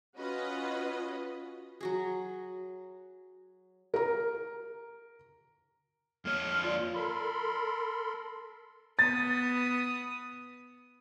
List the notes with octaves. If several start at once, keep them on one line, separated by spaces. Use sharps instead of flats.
C#4 F4 F#4 B4 D#5
F#3 F#4 G#4
A#4 A#5
F2 A#3 C#5 F6
F4 D5
A4 A#4 B5 C6
B3 D#6 A6